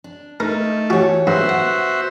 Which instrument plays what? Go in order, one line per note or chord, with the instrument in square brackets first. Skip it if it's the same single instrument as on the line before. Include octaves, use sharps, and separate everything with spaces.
[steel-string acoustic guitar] D4
[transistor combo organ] A3 [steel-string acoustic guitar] D#4 [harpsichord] A#4
[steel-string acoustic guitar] E3 C#5 [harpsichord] F#4 G4
[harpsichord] G2 [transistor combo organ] F#4 C5 E5
[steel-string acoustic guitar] B3 [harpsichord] F#5